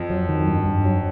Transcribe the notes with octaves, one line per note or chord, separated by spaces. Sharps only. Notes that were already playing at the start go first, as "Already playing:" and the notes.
Already playing: F2
F#3
D#3
G2
G2
F#3